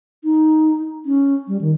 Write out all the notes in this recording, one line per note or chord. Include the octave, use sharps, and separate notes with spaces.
D#4
C#4
G3
D#3